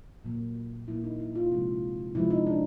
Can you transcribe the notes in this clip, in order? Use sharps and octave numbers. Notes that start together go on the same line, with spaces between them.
A#2 F#3 A#3
A#2 F#3 A#3 E4
D#4
E4
F4
C3 F3 G#3
C3 F3 G#3 E4
D#4
D4